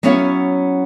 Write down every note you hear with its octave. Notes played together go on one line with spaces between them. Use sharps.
F#3 B3 C#4 E4 C#5 F5